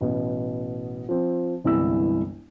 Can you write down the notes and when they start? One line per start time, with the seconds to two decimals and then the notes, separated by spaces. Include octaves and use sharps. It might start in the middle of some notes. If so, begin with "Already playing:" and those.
0.01 A1 B2
1.09 F3 C4
1.64 G1 C2 E3 G#3 E4 E6